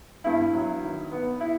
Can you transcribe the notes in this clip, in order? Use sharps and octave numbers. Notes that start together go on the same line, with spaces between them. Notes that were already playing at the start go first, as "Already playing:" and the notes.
G2 E4
F#3
D#3
B3
E4